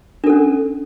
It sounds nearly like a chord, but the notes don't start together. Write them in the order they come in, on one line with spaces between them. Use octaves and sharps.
D4 A4 C#4